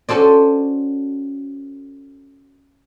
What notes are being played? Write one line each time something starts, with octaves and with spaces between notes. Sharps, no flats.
C#4 F#4 A4 C5 D5